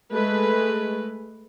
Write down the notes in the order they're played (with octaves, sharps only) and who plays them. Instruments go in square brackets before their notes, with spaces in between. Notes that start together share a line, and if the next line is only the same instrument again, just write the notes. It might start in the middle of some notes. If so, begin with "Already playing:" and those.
[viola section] G#3 A3 B4